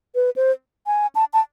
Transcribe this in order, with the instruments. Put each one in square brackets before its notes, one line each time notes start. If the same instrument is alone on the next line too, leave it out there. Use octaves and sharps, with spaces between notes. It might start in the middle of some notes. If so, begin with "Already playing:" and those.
[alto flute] B4
C5
G#5
A5
A5